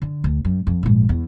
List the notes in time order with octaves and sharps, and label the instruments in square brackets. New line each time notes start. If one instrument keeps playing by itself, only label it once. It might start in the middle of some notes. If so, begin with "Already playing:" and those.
[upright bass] D3
D2
F#2
F2
A#1 G#2
E2